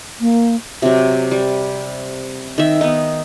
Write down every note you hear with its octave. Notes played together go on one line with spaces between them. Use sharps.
A#3
C3 F#3
G3
D#3 E5
B3 D#4